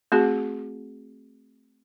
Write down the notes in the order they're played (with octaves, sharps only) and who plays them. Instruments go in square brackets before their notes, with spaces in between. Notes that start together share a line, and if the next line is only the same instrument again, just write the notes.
[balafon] A3 C4 F#4 G#4